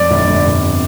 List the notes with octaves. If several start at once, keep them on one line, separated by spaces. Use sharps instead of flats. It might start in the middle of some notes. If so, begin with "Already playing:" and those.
Already playing: F2 D5
G1
G1
C3